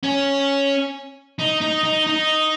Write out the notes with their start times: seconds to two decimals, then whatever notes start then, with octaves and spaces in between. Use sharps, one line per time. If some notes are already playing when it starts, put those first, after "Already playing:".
0.04 C#4
1.39 D#4
1.61 D#4
1.84 D#4
2.07 D#4